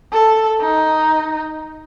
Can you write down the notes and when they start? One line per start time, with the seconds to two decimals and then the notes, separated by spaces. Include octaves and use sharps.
0.12 A4
0.60 D#4